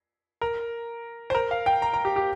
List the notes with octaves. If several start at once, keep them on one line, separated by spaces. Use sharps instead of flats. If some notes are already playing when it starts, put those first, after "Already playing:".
A#4
C5
A#4
F5
G5
A#5
A#5
G4
G4